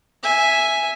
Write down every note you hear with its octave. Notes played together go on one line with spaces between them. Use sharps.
E5 G#5